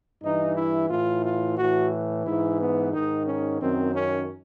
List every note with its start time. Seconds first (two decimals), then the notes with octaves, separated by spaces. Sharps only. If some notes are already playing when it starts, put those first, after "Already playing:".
0.22 G2 E3 D#4
0.56 E4
0.90 A2 E3 F4
1.24 F4
1.58 A2 E3 F#4
2.25 G#2 E3 E4
2.60 B3
2.93 G#2 D#3 D#4
3.27 C#4
3.62 F#2 D#3 C4
3.95 C#4